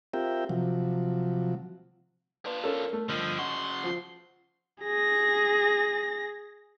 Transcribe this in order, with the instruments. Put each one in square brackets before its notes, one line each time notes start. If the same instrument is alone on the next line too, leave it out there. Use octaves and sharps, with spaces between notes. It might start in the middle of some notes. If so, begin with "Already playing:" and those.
[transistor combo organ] C4 F4 G4 A#4 E5 G5
C3 F3 F#3
[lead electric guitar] D4 F4 [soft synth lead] B4
[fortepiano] C#4 A4 [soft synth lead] A#4
[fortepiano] A3
[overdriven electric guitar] G2 D3 [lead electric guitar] F3 [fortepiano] D#5 [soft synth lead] E6
[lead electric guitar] C#3 F#4 [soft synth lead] F#5 [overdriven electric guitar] C6
[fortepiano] F3
[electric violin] G#4 A#6